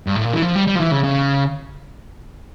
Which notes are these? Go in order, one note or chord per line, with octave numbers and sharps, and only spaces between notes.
G2
A2
A#2
E3
F3
G3
G3
F3
E3
C#3
C#3